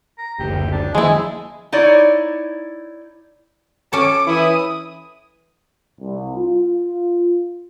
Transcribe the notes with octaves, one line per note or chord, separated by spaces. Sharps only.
A#5
F#1 D2 G4
D4
D#3 F3 G#3 A#3 E4 G#4
D#4 E4 C#5 D5
C#4 A4 D6
E3 E4 D#6
C2
F4